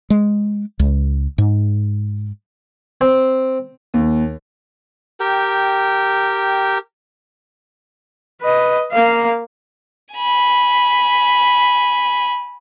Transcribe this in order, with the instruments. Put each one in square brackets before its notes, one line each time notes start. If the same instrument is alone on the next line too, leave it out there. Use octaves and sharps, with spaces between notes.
[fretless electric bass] G#3
C#2
G#2
[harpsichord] C4
[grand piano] D#2
[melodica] G4 A#4 G5
[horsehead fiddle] B4 D#5
A#3 F5
[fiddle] G#5 B5